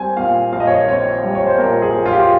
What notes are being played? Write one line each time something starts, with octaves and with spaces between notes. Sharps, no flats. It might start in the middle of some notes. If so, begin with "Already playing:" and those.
Already playing: G3 C4 G#5
A#2 F5
A#1 F5
D#5
C#5
D#5
C4 C#5
G3
C#5
C5
A#2 A#4
G#4
A#1
F4
G4
F4